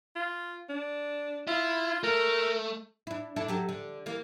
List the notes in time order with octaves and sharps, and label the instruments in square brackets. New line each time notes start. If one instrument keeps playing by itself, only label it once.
[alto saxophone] F4
D4
[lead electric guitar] E4 [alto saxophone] F4
[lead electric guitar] A3 [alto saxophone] A#4
[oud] D4 E4
D4 E4 A4
F#3 G4 A4
D3
E3 A#3